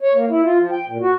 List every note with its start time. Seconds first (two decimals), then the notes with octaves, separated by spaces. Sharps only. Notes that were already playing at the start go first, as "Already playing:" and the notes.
0.01 C#5
0.14 A#3
0.30 E4
0.44 F4
0.59 F3
0.71 G5
0.88 A#2
1.01 F#4